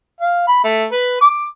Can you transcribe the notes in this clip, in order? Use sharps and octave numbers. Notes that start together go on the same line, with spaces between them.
F5
B5
A3
B4
D6